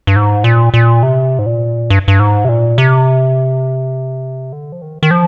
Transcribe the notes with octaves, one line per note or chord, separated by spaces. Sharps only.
G2
G#2
A#2
A#2
C3
G#2
A#2
G2
G2
G#2
C3
A#2
C3
D3
F3
D#3
D#3
F3